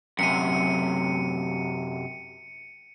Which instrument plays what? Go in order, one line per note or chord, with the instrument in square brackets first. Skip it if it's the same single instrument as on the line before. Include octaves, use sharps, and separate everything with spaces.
[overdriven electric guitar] F#2 C3 [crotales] C#7 D#7